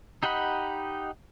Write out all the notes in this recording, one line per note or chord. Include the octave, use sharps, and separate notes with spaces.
D#4 G4 D#5 F#5 B5